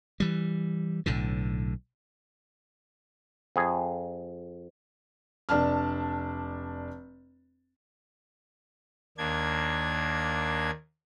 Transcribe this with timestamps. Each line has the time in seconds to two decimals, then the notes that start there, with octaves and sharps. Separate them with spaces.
0.20 E3 G3
1.06 B1 A2 D3
3.56 F2 G#4
5.49 F1 D4 A5 F6
9.18 D#2 A#3 D4 G#6